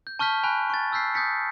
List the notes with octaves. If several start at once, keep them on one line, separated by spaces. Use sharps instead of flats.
G6
A5 C#6 F6 G6 B6
G#5 B5 F#6
C#6 A6
E6 F6 G6 B6 C7
D#6 G6 A6 B6 C#7